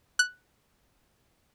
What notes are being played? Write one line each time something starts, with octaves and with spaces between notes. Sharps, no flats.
F#6